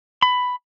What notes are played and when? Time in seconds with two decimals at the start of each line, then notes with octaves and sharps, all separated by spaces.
0.22 B5